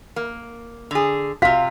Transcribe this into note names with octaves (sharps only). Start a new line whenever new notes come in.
A#3
D3 G#4
C3 F4 F5 B6